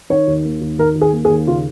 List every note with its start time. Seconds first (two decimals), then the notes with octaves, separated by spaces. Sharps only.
0.10 D#3 C#5
0.27 D#2
0.45 A#3
0.61 D#2
0.78 D#3 A#4
0.95 D#2
1.01 G#4
1.13 A#3
1.25 G#4
1.30 D#2
1.47 C#3 F4